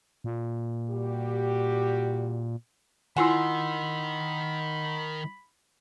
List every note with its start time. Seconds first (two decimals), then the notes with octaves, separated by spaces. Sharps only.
0.24 A#2
0.90 G3 F#4 G4
3.17 D#3 E4 F4 F#5 G#5 B5 C6 E6